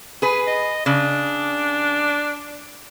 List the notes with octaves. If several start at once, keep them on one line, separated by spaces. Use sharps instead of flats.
G#4 B4
D#5
C#3 D4